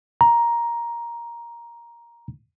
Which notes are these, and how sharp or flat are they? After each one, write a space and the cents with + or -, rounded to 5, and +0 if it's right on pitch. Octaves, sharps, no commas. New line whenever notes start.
A#5 +10